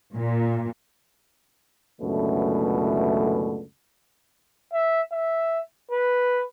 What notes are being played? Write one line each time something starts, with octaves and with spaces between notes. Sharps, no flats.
A#2
C#2 F#2 B2 D3 E3 A3
E5
E5
B4